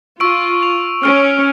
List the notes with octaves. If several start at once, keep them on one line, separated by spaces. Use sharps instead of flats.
F4 C#6 E6 D7
F7
C#4 F6 D7